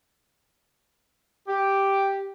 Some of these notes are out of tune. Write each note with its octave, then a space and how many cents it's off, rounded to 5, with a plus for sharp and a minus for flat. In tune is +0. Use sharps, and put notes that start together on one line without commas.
G4 +0